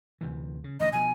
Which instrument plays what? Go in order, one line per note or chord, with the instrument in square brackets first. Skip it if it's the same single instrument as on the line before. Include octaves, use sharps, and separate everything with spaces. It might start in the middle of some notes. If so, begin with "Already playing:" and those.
[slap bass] D2 C3 E3
C#3
[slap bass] A1 G#2 D3 [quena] D#5
[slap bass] B2 F3 [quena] G#5